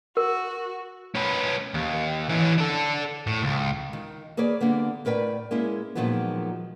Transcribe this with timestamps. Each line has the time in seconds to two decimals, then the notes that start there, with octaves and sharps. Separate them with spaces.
0.17 F#4 A#4
1.15 C#4 B4
1.75 D#2
2.30 E3 C#4
2.58 D4 A4
3.27 A2
3.42 C#2
3.93 D#3
4.37 A#3 G#4 B4 C#5 D5
4.61 D3 G3 A#3 B3
5.05 A2 A#4 B4 D5 G5
5.51 G#3 A#3 C#4 E4
5.95 A#2 D#3 F3 F#3 G#3 B3